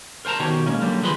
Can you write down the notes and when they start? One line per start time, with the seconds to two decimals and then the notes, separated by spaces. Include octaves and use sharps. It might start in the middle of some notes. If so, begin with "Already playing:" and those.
0.25 A#4 C5 G5 A5 A#5
0.40 B2 D#3 G4 C#5
0.67 G#3 A#3 C#4
0.81 D3 F#3 G3 A#3
1.02 D#3 F3 G#4 B4 B5 C6